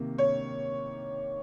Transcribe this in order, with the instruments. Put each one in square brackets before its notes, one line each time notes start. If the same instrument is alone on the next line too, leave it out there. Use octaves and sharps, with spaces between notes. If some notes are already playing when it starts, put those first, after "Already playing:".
Already playing: [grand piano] C3 D#3 A#3
C#5